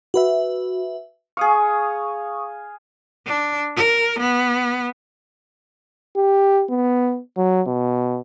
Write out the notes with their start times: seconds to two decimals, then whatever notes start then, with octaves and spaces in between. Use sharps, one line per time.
0.14 F#4 B4 E5
1.37 G#4 F5 C#6 D#6
3.26 D4
3.76 A#4
4.19 B3
6.16 G4
6.69 B3
7.37 F#3
7.67 B2